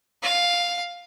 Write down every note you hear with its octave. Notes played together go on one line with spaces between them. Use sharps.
F5